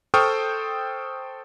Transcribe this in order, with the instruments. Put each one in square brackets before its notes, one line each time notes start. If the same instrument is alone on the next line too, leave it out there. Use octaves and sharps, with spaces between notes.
[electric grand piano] A4 C5 G5 C#6 D#6 F6